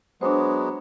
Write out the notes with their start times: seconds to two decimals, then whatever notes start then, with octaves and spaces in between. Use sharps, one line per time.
0.21 F#3 G#3 B3 D4 C5